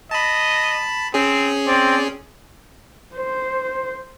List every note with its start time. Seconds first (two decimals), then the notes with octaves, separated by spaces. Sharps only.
0.11 D#5 A5 B5
1.14 C4 C#4 G#4
1.67 C4 D5
3.15 C5